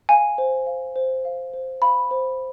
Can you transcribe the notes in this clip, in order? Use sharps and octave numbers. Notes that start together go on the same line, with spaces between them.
F5 G#5
C5
F5
C5
F5
C5
F5 B5
C5